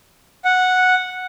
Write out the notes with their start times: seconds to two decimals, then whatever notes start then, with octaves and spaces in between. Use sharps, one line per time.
0.45 F#5